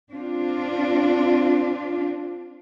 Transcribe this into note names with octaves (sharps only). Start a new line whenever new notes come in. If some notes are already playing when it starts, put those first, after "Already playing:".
C4 D4 F4